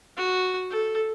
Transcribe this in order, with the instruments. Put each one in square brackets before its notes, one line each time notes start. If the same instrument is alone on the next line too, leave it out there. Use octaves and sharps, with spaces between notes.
[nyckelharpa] F#4
A4